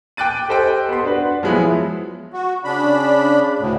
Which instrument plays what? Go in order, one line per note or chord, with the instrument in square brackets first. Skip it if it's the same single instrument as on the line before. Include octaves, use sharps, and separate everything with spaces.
[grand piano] G5 D6 F#6 A6 D#7
G4 A4 C5 D#5 G5
B3 G4 C6
D4 F#4 B4 D5
F3 F#3 G#3 B3 E4
[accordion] F#4
C#3 D4 B5
D2 A2 C#3